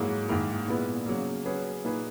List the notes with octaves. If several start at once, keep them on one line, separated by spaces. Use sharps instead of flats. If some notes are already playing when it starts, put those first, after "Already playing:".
Already playing: G#2 F#3 A#3 E4 G#4
G#2 D#3 A#3 E4 A#4
A#2 G#3 B3 E4 B4
C#3 F#3 A#3
F#3 C#4 G#4 B4
A#2 A#3 D#4 G#4 B4